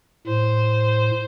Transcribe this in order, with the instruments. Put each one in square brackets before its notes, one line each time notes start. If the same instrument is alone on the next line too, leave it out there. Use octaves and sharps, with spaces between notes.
[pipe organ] A2 [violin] C5